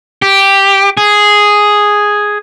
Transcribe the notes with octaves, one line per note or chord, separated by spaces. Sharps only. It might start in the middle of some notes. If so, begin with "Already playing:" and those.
G4
G#4